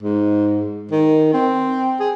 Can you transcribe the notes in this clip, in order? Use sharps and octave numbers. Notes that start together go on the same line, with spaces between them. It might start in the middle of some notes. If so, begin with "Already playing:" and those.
G#2
D#3
C4
G#4